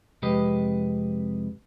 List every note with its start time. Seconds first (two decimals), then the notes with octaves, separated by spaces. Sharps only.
0.22 F2 C3 G#3 G4 B4 D#5